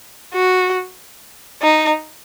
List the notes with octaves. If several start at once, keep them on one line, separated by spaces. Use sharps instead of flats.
F#4
D#4